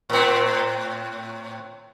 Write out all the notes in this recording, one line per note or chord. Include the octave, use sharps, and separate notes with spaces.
A2 C4